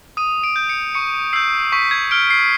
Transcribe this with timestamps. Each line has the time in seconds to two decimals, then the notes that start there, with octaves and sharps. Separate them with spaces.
0.17 D#6 D#7
0.44 D7
0.56 G6
0.69 C#7
0.95 C#6 C#7
1.33 E6 G6 C7
1.72 C#6 B6
1.91 G#6
2.11 F6 D7
2.30 C7